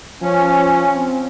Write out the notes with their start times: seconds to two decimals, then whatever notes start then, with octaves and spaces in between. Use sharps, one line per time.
0.22 F3 C#4
0.95 C4